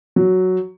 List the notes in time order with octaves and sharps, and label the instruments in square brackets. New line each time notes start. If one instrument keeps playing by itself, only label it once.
[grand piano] F#3